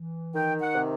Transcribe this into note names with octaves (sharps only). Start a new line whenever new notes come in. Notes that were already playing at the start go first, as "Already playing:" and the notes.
Already playing: E3
D#3 G5
F#5
C3